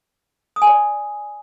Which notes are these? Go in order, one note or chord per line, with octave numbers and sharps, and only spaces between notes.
D#6
G#5
D5